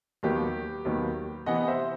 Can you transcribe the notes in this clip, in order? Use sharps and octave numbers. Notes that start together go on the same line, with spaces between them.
D#2 D#3 F#3 B3 G4
D#2 D#3 F#3 B3
C3 E3 B3 D#5 F#5
C5 E5